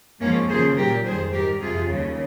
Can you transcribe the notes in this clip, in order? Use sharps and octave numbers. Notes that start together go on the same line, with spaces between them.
G#2 F3 A#3 C#4
D#2 C#3 F3 G#4 C5
A#2 G3 G4 A#4
F2 D#3 G3 G#4 C5
G#2 G3 G4 A#4
F2 C3 F3 F4 G#4
D#2 C#3 G3